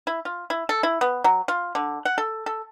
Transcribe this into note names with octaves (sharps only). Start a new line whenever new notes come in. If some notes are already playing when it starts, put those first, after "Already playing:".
E4
F4
E4
A4
E4
B3
F#3
F4
D3
F#5
A4
A4